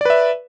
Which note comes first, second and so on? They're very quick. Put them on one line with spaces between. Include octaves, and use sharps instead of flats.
D5 B4 E5